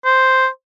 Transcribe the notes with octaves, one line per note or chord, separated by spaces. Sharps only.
C5